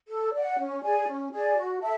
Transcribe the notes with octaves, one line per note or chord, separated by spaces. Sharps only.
A4
D5 F#5
C#4
G#4 D5 G#5
C#4
G#4 D5 G#5
F#4
A4 E5 A5